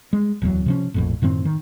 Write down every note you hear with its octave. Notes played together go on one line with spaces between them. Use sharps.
G#3
D1 E2 F#3
C3 F3 C#4
A#1 F2 A2
F#2 A2 D#3 C4
D#3